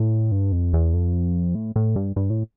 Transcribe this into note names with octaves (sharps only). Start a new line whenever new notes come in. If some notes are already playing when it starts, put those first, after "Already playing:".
Already playing: A2
G2
F2
E2
F2
A2
A2
G2
G2
A2